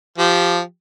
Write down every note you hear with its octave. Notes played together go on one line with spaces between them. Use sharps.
F3 G4